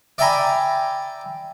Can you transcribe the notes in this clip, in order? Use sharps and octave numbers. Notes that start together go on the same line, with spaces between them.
D5 E5 G5 G#5 A#5 B5